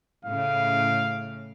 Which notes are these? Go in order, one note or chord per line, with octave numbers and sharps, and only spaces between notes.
A2 C#3 F5